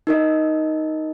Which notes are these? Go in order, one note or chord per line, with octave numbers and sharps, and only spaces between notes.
D#4 A#4 D#5